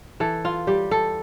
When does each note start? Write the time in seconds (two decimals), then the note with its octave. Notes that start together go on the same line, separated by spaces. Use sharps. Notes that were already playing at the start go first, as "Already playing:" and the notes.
0.20 E3 A4
0.45 F4
0.67 G3 G4
0.91 A4